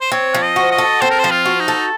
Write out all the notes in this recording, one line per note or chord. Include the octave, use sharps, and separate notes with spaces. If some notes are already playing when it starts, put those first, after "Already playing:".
C5
C4 C#5
F3
D#5
F#4
D#5
A4
C4 C5
A#4
F3 C5
F4
F#4
D#4
A4